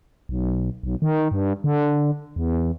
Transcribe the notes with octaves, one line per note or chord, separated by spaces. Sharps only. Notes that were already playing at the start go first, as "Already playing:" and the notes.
B1
B1
D#3
G2
D3
E2